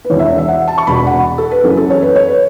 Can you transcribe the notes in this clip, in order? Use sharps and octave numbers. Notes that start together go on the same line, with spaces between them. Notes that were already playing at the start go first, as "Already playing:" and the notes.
B4
E1 E2 E3 C#5
E5
E5
F#5
A5
C#6
E1 E2 B2 B5
F#5
A4
B4
F#1 F#2 E3 A4
A4
C#5
B4
C#5
B4